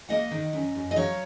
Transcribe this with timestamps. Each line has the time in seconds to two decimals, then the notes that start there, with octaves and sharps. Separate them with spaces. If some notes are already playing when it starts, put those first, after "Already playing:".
0.09 A#3 D#5 F#5
0.31 D#3
0.53 F#2
0.75 F#2
0.91 D#5
0.96 F#3 C#5 F5